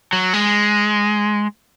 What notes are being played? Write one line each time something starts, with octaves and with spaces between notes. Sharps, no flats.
F#3
G#3